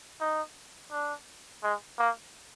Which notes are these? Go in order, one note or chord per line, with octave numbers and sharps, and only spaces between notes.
D#4
D4
G#3
A#3